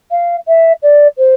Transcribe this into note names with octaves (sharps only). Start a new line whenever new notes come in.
F5
E5
D5
C5